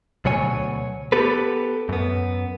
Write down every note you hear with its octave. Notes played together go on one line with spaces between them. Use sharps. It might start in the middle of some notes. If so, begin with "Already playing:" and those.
D2 B2 F#3 C#5 G#5
B3 G4 A4 B4
F#2 B3